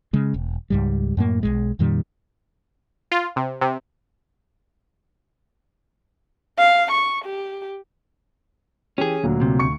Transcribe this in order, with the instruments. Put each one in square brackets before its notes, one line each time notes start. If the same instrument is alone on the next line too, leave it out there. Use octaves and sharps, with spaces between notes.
[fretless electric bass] C#3 G#3
E1
C#2 G#2 G3
F#2 A2 A#3
B1 E2 G#3
F2 A#2 D#3 G3
[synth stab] F4
C3
C3
[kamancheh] F5
C#6
G4
[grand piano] E3 G4 [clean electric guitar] C#4 G#4
[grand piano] D2 A#2 F#3
[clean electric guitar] C3
[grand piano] D2 C#6 C#7